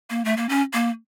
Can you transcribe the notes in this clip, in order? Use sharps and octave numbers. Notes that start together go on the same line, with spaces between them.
A#3
A3
A#3
C#4
A#3